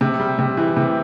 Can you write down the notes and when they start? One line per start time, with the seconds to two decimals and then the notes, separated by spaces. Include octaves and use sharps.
0.01 C3
0.20 G3
0.39 C3
0.57 E3
0.77 C3